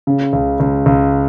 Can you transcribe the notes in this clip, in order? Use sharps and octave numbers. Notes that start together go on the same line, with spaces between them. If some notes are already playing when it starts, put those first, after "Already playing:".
C#3
C#2
C#2
C#2